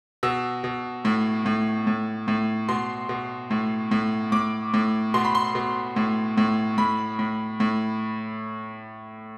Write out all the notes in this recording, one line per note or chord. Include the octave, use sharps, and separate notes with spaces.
B2 E6
B2
A2
A2
A2
A2
B2 C6
B2
A2
A2
A2 D6
A2
B2 C6
B5
C6
B2
A2
A2
A2 B5
A2
A2